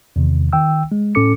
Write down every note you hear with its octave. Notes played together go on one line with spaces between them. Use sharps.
E2 C3 D#3
D#3 G5 E6
G#3
A2 C#4 A4 D6 C#7